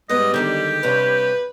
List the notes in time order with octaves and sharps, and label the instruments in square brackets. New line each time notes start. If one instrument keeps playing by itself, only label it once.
[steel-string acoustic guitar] G#2 G#3 B3 [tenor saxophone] G3 [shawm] D#5
[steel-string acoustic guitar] D3 D#3 G#3 [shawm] G4
[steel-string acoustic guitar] G2 C3 C#5 [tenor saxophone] B4